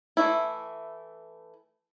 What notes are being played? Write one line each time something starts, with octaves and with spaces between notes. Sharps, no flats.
E3 G#3 A3 E4